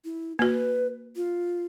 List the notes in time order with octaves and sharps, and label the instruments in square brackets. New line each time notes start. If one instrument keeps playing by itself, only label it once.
[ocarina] E4
[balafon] A#3 F#4 [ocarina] B4
[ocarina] F4